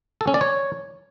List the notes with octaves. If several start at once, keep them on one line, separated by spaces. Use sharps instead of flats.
A4
C#4
D5
C#5